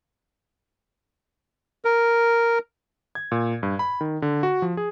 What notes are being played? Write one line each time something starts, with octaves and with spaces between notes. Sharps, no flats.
A#4
G#6
A#2
G2
B5
D#3
D3
F#4
F3
G#4